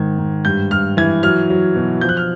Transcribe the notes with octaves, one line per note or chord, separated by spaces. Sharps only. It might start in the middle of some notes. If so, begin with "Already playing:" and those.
Already playing: G#2 D#3 G#6
G#2
G2 G6
G2 F6
E3 G#6
F#3 F6
F#3
B2
F3 G6
F#6
F6